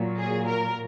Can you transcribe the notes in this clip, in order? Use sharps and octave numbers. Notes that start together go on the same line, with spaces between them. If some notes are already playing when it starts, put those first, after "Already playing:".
Already playing: A#2 F#3
G#4
A#4